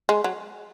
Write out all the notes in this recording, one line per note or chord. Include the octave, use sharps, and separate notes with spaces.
G#3
F#3